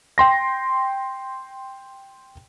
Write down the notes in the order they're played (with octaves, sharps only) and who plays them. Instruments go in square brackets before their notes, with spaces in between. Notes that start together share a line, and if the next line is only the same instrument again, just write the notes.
[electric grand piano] G5 C6 A#6